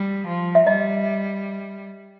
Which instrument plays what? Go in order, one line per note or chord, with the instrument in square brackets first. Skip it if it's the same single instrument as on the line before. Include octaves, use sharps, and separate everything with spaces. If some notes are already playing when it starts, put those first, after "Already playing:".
Already playing: [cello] G3
F3
[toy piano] E5
[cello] G3 [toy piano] D#5